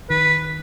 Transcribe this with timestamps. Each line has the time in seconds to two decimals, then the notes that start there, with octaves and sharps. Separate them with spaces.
0.10 D#3 B4